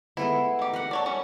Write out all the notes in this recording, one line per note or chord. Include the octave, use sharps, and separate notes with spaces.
G#3 A3 B3 E4
D#3 G4
A#4 E5 F#5
A4 C#5 D5
G3 C#4